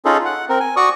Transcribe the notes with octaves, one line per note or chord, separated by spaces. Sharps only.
C#4 D#4 F4 G#4 A4
F#5
C4 A#4
G#5
F#4 D5 C#6 D#6